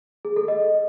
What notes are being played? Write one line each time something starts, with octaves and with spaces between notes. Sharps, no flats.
G#4
A4
D#5